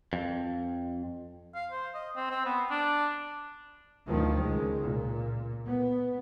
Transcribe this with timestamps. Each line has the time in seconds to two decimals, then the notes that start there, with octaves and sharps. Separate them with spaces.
0.13 F2
1.55 F5
1.72 C5
1.95 D#5
2.16 C4
2.30 C4
2.45 B3
2.70 D4
4.07 D2 D#3 F3
4.40 C#2 G#3
4.82 A#2
5.66 B3